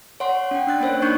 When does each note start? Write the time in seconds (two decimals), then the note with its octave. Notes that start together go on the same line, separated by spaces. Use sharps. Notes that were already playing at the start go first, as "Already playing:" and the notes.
0.20 C#5 F#5 C6
0.51 C#4 G5
0.67 D4 F#6 A6
0.81 A#3 C#4 C5 C#5
1.02 D4 D#4 C#6 G6